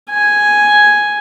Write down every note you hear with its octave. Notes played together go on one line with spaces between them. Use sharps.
G#5